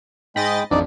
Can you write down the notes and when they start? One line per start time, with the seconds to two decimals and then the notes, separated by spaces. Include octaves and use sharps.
0.36 G#2 G#3 D#5 G5 B5 A6
0.71 A1 F2 D4 D#4 D5